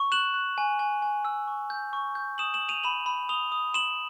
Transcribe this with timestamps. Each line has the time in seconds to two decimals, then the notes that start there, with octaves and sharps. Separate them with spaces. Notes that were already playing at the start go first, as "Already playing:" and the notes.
Already playing: C#6
0.12 F#6 E7 F#7
0.34 F#6
0.58 G#5
0.79 G#5
1.02 G#5
1.25 E6
1.48 C#6
1.70 G6
1.93 C#6
2.15 G6
2.38 D#6 E7 F#7
2.54 E7 F#7
2.61 D#6
2.69 D#7 F7
2.83 B5 E7 F#7
3.06 B5
3.29 D#6 F7 G7
3.52 D#6
3.74 C6 E7 F#7